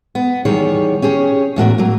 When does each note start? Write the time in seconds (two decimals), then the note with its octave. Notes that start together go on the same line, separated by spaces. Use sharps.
0.15 B3
0.45 E2 D#3 G3 G#4 C#5
1.02 C#4 G4 G#4 C#5
1.56 E2 A2 F#4 A#4
1.78 F#3 A#3